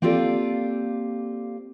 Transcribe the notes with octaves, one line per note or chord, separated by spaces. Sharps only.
A#3 C4 F4 G4 A4 D5